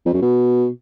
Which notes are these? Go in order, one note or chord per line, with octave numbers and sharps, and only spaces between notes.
F2
F#2
B2